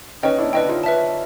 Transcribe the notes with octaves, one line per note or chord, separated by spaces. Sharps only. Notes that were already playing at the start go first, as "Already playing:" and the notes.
C#4 D#4 B4 D#5 G5
D4 E4
D4 E4 B4 D#5 G5
D#4 F4
B4 E5 A5